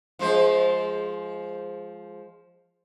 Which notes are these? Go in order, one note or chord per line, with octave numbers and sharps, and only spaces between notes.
F3 G#3 C5